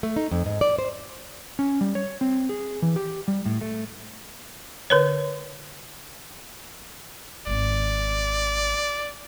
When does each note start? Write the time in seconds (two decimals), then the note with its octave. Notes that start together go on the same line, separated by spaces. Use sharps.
0.03 A3
0.16 D#4
0.31 F2
0.46 G#2
0.61 D5
0.79 C5
1.59 C#4
1.81 G3
1.95 C#5
2.21 C4
2.49 G#4
2.82 E3
2.96 G4
3.28 G3
3.46 A2
3.61 A3
4.90 D3 B4 C#5
7.47 G#1 D#3 D5